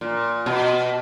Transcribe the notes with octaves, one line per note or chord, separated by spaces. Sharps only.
A#2
B2